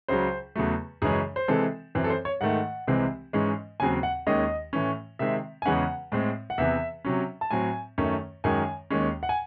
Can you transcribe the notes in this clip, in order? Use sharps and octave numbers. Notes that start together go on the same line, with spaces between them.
C#2 C#3 F#3 C5
E2 C#3 F#3 A3
F#2 C#3 E3 G#3 C#4 G#4
C5
C3 E3 G#3 C4 A4
F#2 E3 C4
A4
C5
C#5
G#2 D#3 A3 F#5
C2 C3 E3 G#3 C4
G#2 E3 G#3 C#4
D#2 C#3 F#3 C4 G#5
F#5
D#2 D#3 G#3 C#4 D#5
A2 E3 A3 C#4
C3 D#3 G#3 C4 E5
G#5
E2 C#3 E3 G#3 C#4 F#5
A2 G#3 C4
F#5
E2 C3 E3 E5
C3 F#3 C#4
A5
A2 F#3 C4 G#5
F#2 D#3 A3 C#4
F#2 D#3 G#3 C#4 G#5
D#2 D#3 G#3 C#4
F#5
G#5